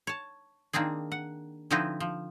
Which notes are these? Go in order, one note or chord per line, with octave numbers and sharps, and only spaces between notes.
C#5 A5
D#3 A#3 C4 D4 G#4
F#5
D3 F3 C4 D#4 E4 B4
F3